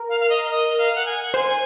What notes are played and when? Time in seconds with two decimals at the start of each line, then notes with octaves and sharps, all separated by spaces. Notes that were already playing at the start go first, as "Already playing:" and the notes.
Already playing: A#4
0.09 F5
0.20 F5
0.30 D#5
0.51 D#5
0.78 F5
0.95 F#5
1.06 G#5
1.23 F#5
1.34 C5 G#5